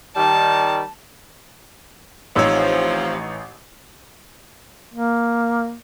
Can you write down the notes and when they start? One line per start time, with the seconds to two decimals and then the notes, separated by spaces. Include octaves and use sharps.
0.17 D#3 G3 A5
2.36 A1 C3 F3 D#4 C#5 E6
4.93 A#3